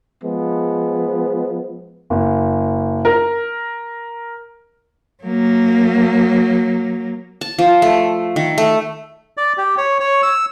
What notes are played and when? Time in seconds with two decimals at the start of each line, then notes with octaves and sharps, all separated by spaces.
0.23 F3 G#3 B3
2.10 F#1
3.05 A#4
5.24 F#3 A#3
7.41 A5
7.58 F3
7.82 A3
8.36 D#3
8.58 A3
9.37 D5
9.58 G4
9.78 C#5
10.00 C#5
10.23 E6